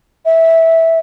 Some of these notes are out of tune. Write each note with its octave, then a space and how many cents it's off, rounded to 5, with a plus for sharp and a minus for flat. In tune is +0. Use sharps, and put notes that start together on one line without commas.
E5 -10